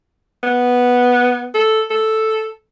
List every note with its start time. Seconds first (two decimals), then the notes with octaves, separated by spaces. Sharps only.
0.43 B3
1.54 A4
1.90 A4